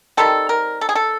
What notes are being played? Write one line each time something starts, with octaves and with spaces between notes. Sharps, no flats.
D#3 G3 C4 A4
A#4
A4
G#4
A4